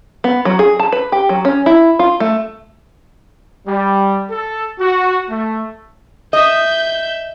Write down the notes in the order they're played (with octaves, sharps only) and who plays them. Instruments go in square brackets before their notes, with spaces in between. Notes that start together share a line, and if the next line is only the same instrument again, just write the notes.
[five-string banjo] B3
F#3
G#4
A5
B4
G4
F#3
C#4
E4
F4
A3
[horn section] G3
A4
F#4
A3
[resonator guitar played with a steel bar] D#5 [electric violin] E5 G6